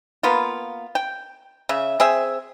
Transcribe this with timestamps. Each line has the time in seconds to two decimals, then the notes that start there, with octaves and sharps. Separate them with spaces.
0.23 A#3 B3 F4
0.95 G5
1.69 C#3 E5
2.00 C4 G#4 E5